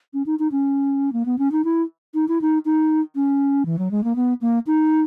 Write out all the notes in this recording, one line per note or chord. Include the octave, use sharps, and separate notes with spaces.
C#4
D#4
D#4
C#4
A#3
B3
C#4
D#4
E4
D#4
E4
D#4
D#4
C#4
E3
F#3
G#3
A#3
B3
A#3
D#4